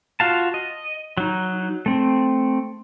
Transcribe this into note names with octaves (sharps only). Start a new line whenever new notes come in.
F4 F#4 F5 A5
D#5
F#3 D#4
A3 C4